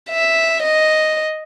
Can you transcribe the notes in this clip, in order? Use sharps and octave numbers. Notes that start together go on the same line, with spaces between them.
E5
D#5